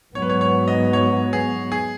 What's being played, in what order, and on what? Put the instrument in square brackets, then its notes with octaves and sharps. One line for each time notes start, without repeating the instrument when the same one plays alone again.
[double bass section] G#2 F#3 B3 [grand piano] C#5
[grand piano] B4
C#5
C#5
D#5
C#5
G#4
G#4